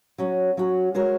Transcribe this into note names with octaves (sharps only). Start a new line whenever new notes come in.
F#3 C#4 F#4
F#3 C#4 F#4
G#3 F#4 A#4 C#5